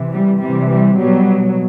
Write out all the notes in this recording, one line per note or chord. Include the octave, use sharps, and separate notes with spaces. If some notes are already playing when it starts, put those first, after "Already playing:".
Already playing: C3 E3
G3
C3 E3 G3
G3
B2 F#3 G3